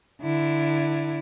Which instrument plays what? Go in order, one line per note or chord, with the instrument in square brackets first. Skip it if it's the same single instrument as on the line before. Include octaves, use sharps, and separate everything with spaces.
[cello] D3 E4